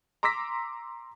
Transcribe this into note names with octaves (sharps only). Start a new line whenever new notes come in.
A#5 C6 D6 E6 A#6 B6